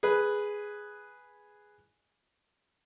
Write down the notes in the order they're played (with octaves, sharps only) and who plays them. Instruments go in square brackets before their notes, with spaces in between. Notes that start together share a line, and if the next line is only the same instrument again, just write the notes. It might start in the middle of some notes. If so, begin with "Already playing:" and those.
[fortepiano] G#4 B4